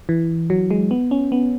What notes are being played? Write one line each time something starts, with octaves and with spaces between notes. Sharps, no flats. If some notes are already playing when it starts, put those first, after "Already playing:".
E3
F#3
G#3
B3
C#4
B3